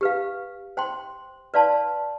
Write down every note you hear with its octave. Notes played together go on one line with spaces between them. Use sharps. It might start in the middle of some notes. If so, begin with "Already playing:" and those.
G4 B4 F5
C5 G5 C6
B4 D5 F5 A5 C6